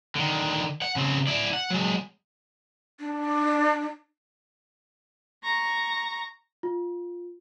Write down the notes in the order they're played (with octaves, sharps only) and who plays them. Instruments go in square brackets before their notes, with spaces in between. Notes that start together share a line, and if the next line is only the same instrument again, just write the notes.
[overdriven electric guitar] D3 D#3
F#5
C#3 C4
E4 D5
F#5
F#3 G#3
[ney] D4
[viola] A#5 C#6
[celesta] F4